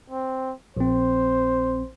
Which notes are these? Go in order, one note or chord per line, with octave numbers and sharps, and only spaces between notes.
C4
A#1 C4 C5